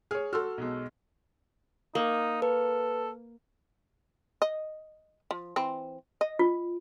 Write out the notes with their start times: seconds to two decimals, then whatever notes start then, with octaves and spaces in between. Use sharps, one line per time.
0.11 G#4 C#5 F6
0.33 F#4 A4 C6 E6 F6
0.58 B1 B2 G#3
1.95 A#3 D#4
2.42 A4 B4
4.42 D#5
5.31 F3
5.56 E3 C4
6.21 D#5
6.39 F4